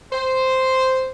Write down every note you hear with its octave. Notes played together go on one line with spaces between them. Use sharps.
C5